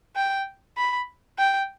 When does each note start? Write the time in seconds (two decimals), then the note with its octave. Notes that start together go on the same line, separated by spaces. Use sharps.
0.16 G5
0.77 B5
1.38 G5